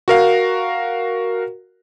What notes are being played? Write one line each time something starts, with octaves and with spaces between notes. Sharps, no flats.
F#4 A#4 F5